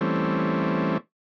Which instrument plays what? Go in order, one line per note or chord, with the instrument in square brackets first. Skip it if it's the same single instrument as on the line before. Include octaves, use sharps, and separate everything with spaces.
[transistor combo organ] E3 G3 A3 C4 C#4